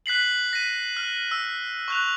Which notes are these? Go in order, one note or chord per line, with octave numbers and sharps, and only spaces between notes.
F#6 B6 C7 F#7
A#6 B6 D#7
F6
E6
C#6 F#6 F7